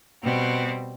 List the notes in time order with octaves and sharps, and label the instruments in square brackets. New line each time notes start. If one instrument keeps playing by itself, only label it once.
[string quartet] B2 G3 C4